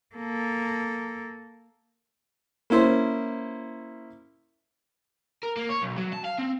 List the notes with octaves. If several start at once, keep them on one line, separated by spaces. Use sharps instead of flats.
A#3 A4
A#3 C#4 E4 C5
A#4
A#3
C#5
B1
F#3
A5
F5
C4